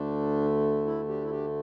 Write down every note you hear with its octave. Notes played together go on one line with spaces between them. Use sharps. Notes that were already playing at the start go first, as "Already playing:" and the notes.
Already playing: D2 D3 A3 D4
E4
D4 G4
E4
D4 G4